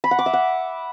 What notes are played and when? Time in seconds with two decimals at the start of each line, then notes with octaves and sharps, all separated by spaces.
0.04 B5
0.11 F#5
0.19 D6
0.26 E5
0.33 F#5